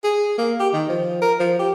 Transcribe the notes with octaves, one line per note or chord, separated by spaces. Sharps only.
G#4
A#3
G4
D#3
F3
A#4
F3
G4